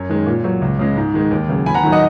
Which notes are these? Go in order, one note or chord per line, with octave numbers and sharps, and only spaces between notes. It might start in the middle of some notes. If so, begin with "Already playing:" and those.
Already playing: F#2 C#5
D#3 G#3
A#2
F#3
C#2
C#3 G#3
G#2
D#3 G#3
D#2
C#3 F#3
D#2 G#5 B5
F#5 A#5
D#3 F#3
D#5 F#5